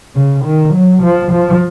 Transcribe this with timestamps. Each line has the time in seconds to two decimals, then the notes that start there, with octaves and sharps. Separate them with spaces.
0.16 C#3
0.45 D#3
0.74 F#3
1.03 F3
1.32 F3